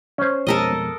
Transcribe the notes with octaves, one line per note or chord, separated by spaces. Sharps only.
C#4 C5
F2 B2 G#3 A4 A#4 D#5